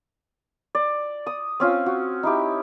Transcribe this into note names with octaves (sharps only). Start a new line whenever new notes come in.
D5
D#6
C4 C#4 F4
F#4
D#4 E4 G4